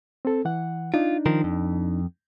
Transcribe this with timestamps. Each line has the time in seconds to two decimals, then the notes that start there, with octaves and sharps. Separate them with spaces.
0.25 C4 A4
0.45 E3 F#5
0.94 D4 D#4 F4
1.26 D#3 F3 A#4
1.44 F2